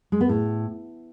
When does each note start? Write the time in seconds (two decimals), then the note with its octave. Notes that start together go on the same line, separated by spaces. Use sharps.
0.12 G#3
0.21 B3
0.29 A2